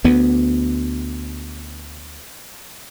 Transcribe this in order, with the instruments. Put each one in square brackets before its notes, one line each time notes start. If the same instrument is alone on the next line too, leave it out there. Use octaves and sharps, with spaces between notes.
[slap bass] D2 B3